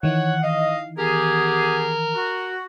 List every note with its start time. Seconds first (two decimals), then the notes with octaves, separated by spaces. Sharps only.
0.03 D#3 E3 C#5 F#5
0.43 D#5 F5
0.98 B3 G4 G#4 A#4
2.15 F#4